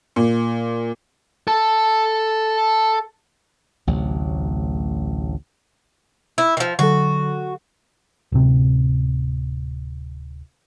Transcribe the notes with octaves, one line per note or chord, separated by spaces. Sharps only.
A#2
A4 A5
A1 D2 C3 F#3
E4
D#3 F3
D3 F#3 F#4 A4
D1 C3